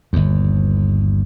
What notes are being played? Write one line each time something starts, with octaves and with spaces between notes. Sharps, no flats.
G1 D#2